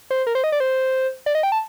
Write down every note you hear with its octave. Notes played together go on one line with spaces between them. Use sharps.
C5
A#4
C5
D#5
D5
C5
D5
D#5
G5
A5